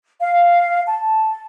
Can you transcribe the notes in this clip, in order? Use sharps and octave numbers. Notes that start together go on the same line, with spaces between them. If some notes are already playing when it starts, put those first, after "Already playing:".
F5
A5